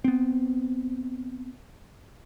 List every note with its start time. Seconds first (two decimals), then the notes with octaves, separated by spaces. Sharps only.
0.04 B3 C4